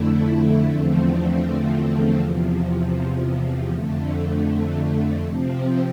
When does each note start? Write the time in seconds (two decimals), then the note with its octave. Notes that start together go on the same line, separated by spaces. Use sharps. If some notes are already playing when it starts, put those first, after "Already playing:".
Already playing: F2 D3 A3 E4
0.66 E2 D3 F3 A3 C4
2.18 E2 C3 F3
3.70 F2 D3 A3
5.22 C3 F3 C4